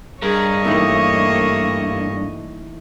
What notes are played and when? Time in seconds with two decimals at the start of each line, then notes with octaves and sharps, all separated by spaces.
0.22 G2 G#4 A#4 C#5 D#5
0.65 E3 A3 A#3 D#4 E4